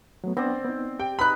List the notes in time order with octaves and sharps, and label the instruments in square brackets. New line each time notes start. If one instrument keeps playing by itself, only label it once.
[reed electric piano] F#3 A3 B3
[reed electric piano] B3 D4 B4 [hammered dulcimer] C4 D5
[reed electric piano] B3 D#4
[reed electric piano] G4 [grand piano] G5
[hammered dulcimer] D#4 B4 [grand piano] B5 F#6